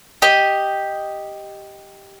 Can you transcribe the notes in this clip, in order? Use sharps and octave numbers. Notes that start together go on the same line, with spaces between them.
G4 D#5